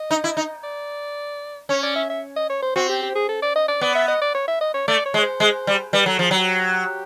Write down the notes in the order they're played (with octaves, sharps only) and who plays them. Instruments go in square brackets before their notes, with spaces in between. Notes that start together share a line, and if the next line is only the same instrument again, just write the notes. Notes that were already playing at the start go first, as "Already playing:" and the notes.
Already playing: [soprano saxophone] D#5
[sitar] D#4
E4
D#4
[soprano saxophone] D5
[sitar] C#4 [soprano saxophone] C#5
[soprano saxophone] D5
E5
E5
D#5
C#5
C5
[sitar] C4 [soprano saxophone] F#4
[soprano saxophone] G4
G4
G#4
A4
D5
D#5
D5
[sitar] B3 [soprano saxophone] D5
[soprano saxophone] E5
D#5
D5
C#5
E5
D#5
C#5
[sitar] A3 [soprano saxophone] D5
[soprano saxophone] C#5
[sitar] G#3
[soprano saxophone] C#5
C5
[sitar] G#3
G3
[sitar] G3 [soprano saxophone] B4
[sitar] F#3 [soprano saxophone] A4
[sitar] F3 [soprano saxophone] G#4
[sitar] F#3 [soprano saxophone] G4